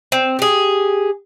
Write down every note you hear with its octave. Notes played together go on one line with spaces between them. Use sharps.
C4
G4 G#4